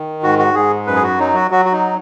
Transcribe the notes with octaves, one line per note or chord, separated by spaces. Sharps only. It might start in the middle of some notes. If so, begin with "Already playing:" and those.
Already playing: D#3
G#2 F#4
F#4
G#2 G#4
F#2 B4
G#4
F#4
F#3 D#4
F#4
F#3 F#4
F#4
D#4